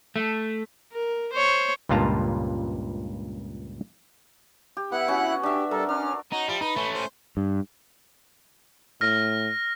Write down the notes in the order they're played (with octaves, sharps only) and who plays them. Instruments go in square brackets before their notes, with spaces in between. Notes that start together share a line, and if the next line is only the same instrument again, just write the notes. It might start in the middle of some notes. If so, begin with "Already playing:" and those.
[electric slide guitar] A3
[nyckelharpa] A#4
C5 C#5
[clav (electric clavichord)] C#2 G2 A#2 F4 A5 A#5
[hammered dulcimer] G4
[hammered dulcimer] B3 [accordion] E4 F#5 F#6
[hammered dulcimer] C#4 F#4
[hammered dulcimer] D4 E5 [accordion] G4
[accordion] G3 A4 [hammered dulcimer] A#4
[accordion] C#4 F6 [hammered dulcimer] D4
[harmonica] C#4 F#4 [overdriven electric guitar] D#4
[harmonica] F3 E4 [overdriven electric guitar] G3
[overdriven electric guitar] D#4 [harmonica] B4
[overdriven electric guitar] A3 C#4
[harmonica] C5
[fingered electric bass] G2
[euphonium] A2 [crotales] F6 A#6